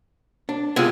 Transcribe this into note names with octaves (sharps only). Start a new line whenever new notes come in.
D4
C3 G#3 B3 F4